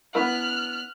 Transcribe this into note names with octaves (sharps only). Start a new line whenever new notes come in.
B3 E4 B4 F6 F#6